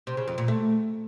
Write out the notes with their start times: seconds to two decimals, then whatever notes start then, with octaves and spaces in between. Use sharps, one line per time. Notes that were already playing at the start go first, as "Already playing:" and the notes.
0.07 C3
0.17 C#3
0.28 F2
0.38 A#2
0.48 A3